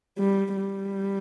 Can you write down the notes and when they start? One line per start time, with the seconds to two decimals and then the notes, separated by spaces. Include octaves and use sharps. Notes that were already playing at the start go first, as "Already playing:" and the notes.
0.19 G3
0.57 G3